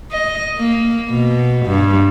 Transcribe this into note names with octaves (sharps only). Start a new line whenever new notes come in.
D#5
A#3
B2
G2